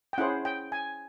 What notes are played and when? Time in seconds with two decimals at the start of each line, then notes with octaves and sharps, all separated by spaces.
0.13 G5
0.18 C#4 E4 G#4 C5 F#5
0.45 G5
0.72 G#5